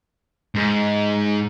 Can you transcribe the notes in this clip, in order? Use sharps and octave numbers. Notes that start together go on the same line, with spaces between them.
G#2